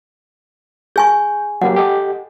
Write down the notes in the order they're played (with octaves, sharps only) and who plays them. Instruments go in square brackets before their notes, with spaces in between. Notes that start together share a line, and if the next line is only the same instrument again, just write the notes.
[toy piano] G#4 G#5 C#6 [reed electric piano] G6
[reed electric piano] F#3 A#3 G4 [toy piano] F#5
[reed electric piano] G4 A4 D#5